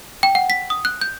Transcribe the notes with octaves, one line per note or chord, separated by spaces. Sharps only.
G5
F#5
B6
D#6
F#6
G6